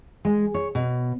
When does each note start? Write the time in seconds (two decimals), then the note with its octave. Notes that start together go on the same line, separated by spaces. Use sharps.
0.25 G#3
0.54 C#5
0.75 B2